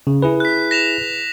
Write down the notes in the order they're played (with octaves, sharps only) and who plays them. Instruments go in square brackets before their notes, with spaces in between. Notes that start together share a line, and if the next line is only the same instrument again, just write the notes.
[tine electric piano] C#3
E4 G#4 B4
[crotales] F#6 B6
A#6 E7 F7